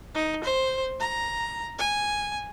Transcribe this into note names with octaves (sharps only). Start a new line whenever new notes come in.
D#4
C5
A#5
G#5